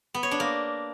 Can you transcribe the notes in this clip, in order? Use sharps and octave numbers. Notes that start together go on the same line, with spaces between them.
B3
C#5
D4
A#3